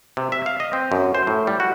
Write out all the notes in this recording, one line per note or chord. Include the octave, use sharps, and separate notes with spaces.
C3
E5
F5
D#5
C4
F#2
C5
A2
G3
F#4